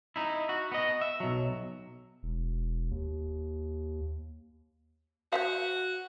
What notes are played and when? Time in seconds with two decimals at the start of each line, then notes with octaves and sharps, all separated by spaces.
0.16 D#4 E4
0.49 F#4
0.72 B3 D#5
1.01 E5
1.20 B1 F#3
2.23 E1
2.91 D#2
5.33 F#4 C5 E5 F5